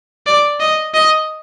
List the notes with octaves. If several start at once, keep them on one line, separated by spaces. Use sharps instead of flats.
D5
D#5
D#5